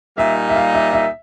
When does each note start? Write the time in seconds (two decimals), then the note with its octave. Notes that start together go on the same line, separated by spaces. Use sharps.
0.18 A#2 G3 A#3 D#4 E5
0.50 E5
0.56 F5
0.74 E5
0.93 E5